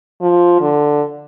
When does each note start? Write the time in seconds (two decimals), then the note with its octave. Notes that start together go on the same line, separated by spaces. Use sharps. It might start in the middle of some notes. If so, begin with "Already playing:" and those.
0.22 F3
0.61 D3